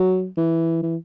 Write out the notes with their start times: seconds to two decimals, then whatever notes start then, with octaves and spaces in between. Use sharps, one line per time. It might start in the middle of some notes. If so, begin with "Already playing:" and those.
Already playing: F#3
0.37 E3
0.83 E3